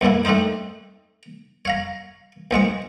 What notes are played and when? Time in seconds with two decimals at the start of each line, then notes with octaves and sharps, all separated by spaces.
0.01 B1 G#2 C#3 A#3 E4
0.25 A3 C4 D4 D#4 C5
1.65 C#5 F5 A#5
2.51 A#1 F3 G#3 C#6